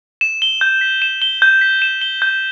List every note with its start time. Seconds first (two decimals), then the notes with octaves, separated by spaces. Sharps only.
0.21 E7
0.42 G7
0.61 G6
0.81 B6
1.02 E7
1.22 G7
1.42 G6
1.61 B6
1.82 E7
2.01 G7
2.22 G6